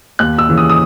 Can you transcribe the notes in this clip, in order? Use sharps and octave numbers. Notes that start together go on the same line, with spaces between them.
D#2 F#6
E6
C#3 E3
D#6
D#6